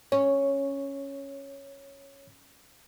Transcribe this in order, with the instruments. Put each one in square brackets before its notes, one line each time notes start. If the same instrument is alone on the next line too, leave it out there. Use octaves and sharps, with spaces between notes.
[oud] C#4 [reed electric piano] C#5